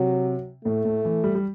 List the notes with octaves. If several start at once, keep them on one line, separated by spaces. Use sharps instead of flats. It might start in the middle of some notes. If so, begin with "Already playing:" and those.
Already playing: C3 F#3
A2 A3
A2
E3
G3
G3